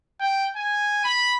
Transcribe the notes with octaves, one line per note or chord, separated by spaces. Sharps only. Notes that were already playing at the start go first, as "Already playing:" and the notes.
G5
G#5
B5